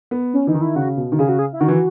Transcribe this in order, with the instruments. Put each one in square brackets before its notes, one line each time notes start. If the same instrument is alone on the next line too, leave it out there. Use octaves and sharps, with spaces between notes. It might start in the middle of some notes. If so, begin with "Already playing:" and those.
[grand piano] B3
[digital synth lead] C#4
[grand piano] E3 [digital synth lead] D#4
[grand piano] D#3
[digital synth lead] E4
[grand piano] C#3 [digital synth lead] F#4
[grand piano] B2
D#3
[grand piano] C#3 [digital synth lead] G#4
[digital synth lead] F#4
G#4
E4
[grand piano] D#3 [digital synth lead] F#4
[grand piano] E3